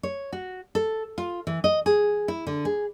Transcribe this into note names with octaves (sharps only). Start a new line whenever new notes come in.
C#5
F#4
A4
F4
E3
D#5
G#4
E4
D3
G#4